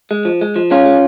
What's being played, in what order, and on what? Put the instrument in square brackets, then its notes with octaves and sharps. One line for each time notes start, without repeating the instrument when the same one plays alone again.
[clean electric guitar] G#3
F3
G#3
F3
G#3 C#4 F4
G#3